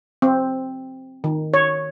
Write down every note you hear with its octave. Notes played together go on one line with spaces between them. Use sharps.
C4
D#3
C#5